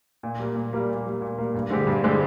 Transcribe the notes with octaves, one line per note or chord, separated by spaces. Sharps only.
A#2
G3 A#3
A#2
G3 A#3
A#2
G3 A#3
A#2
G3 A#3
G2
D3 G#3 C4 G4
G2
D3 G#3 C4 G4